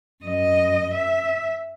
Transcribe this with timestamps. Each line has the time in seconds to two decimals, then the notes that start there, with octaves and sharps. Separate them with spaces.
0.24 F#2 D#5
0.94 E5